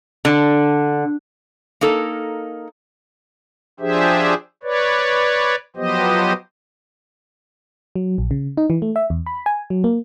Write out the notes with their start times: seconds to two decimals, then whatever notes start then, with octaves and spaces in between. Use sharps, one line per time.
0.25 D3
1.81 A#3 D#4 A4 A#4
3.80 F3 D4 G4 G#4 C5 E5
4.63 B4 C#5 D5
5.76 F3 F#3 B3 G4 C5 D#5
7.96 F#3
8.18 A#1
8.31 C#3
8.57 D#4
8.70 E3
8.82 A3
8.96 E5
9.10 E2
9.26 B5
9.46 G#5
9.70 F#3
9.84 A#3